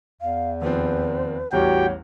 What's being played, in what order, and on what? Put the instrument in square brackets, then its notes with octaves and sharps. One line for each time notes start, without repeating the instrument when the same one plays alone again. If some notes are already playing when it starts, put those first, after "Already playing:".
[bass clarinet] E2 [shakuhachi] F5
[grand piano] D#2 F3 C4 [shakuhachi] B4
[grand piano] A1 E2 G3 [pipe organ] F#4 G4 G5 [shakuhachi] C#5